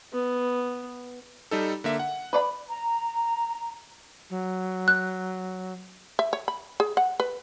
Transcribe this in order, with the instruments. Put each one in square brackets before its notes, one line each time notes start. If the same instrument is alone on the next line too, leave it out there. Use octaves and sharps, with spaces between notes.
[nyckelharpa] B3
[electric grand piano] G3 D#4 A4
D3 A#3 E5
F#5
[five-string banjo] B4 D5 B5
[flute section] A#5
[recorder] F#3
[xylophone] F#6
[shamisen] E5
C#5
B5
G#4
F#5
B4